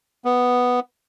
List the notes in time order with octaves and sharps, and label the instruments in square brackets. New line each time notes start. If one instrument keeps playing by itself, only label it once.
[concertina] B3